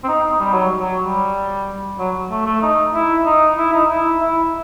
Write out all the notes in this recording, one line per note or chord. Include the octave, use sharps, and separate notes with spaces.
C4
D#4
D#4
G3
F#3
F#3
G3
F#3
A3
A3
D#4
E4
D#4
E4
D#4
E4
E4